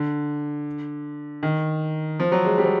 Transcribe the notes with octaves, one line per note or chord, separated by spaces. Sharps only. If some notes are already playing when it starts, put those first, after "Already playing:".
Already playing: D3
D#3
F3
F#3
G#3
G3
F#3